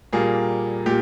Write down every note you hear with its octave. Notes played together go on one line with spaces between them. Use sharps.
A#2 G3 A#3 G#4
A#2 G4